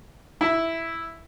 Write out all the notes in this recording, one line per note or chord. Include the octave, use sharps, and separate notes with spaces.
E4